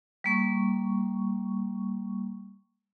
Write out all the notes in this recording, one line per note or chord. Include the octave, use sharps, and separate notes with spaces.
G3 A#3 C#6